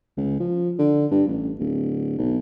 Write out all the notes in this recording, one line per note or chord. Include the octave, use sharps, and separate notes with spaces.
C#2
F3
D3
G2
A1
D1
B1